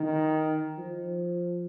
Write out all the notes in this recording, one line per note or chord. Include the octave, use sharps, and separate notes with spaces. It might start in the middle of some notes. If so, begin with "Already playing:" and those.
Already playing: D#3
F3